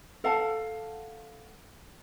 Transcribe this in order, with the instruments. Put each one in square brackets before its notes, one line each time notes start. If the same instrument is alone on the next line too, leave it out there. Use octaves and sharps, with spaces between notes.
[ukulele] A4 F5 F#5 A5